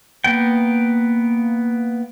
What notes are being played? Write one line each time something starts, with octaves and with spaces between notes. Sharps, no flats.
A#3 B3 G5